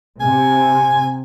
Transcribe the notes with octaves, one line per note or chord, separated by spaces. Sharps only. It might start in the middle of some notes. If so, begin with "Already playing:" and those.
C3 G#5